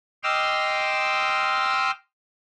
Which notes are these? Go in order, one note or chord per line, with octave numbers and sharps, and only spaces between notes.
D#5 G5 C6 D6 E6 F6